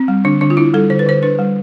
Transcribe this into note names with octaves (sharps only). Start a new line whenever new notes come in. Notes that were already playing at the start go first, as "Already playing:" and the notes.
Already playing: C4
G3
D3 D4
D3 D4
F4
D4 E4
G3 A4
D3 C5
B4
D3 C5
D4 B4
G3